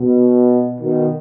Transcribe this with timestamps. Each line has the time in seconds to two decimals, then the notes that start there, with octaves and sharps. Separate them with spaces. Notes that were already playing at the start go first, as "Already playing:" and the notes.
Already playing: B2
0.78 B2 D#3